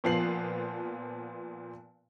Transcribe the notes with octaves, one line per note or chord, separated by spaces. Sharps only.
A#2 F3 B3 C7 F#7